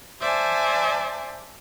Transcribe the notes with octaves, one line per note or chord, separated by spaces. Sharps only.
C5 D5 E5 G#5 A5